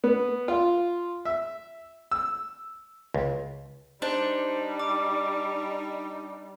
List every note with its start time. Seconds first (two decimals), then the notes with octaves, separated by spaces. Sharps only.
0.04 B3
0.48 F4
1.25 E5
2.11 E6
3.14 C#2
4.02 G3 D4 D#4 C5
4.80 D6